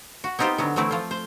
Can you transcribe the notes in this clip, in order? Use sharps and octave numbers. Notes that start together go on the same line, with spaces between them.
F#4
B3 C4 D#4 F4 G4 C5
D3 F#3 B3
E3 F#3 A3 C4 E4
F3 F4
C5